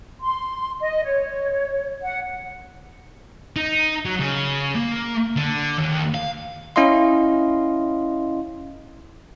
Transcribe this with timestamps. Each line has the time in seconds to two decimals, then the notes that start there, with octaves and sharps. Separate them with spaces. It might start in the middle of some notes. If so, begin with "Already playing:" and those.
0.21 C6
0.80 D#5
1.04 C#5
2.02 F#5
3.56 D#4
4.06 F#3
4.20 C#3
4.75 A#3
5.36 D3
5.78 D#2
6.14 F5
6.76 C#4 E4 D#5 F5 C6